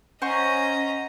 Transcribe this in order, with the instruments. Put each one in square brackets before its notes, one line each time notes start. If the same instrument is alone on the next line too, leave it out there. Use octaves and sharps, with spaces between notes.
[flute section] C#4 [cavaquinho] C5 F#5 C#6 [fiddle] D#5 A#5